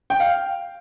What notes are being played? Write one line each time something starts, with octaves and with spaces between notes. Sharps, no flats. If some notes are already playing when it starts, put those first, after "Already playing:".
G5
F5